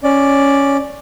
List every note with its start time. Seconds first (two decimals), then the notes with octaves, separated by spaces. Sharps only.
0.03 C#4 D5